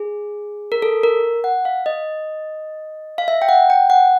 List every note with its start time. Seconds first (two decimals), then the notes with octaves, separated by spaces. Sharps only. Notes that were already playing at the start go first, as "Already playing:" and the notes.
Already playing: G#4
0.72 A#4
0.82 A4
1.03 A#4
1.44 F#5
1.65 F5
1.86 D#5
3.18 F5
3.28 E5
3.42 G5
3.49 F#5
3.70 G5
3.90 F#5